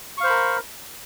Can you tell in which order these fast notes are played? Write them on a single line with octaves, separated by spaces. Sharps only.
C#6 F5 C5 B5 A#4